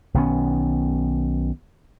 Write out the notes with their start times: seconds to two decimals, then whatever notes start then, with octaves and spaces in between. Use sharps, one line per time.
0.14 B1 D#3 B3 C#4